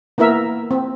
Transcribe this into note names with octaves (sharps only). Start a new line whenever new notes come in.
A#3 B3 E4 A#4 E5
C4